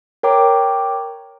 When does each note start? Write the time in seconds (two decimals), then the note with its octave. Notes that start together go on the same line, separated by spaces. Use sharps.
0.23 A#4 C#5 G5 A#5 D6